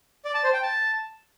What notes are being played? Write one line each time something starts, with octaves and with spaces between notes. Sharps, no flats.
D5
A5
C5
G5
A5